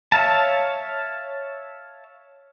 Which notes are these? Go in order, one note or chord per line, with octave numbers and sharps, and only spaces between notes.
C#5 E5 F5 A5